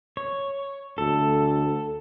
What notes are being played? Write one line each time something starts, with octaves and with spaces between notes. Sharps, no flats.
C#5
D2 A4